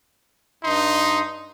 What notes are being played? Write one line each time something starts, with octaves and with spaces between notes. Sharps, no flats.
G2 D#4 C6